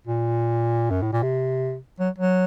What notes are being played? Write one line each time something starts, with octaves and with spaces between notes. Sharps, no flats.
A#2
F#2
A2
A#2
C3
F#3
F#3